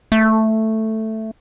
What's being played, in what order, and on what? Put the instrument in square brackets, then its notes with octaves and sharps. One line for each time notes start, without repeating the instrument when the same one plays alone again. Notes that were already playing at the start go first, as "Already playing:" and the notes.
[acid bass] A3